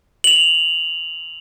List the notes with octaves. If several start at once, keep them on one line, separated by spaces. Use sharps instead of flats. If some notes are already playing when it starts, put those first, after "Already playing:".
F7 F#7